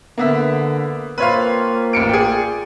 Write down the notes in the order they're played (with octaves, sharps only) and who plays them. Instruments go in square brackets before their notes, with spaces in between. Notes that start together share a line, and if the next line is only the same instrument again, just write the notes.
[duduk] D3 [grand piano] A#3 B3 E5
[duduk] A#3 [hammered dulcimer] C4 F4 [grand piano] B4 C#5 F5
[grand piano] A1 C#7 D7
[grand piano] G#4 G5 [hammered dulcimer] D5